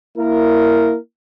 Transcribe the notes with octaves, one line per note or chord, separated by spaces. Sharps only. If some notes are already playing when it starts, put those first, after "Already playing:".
A#3 E4 A#4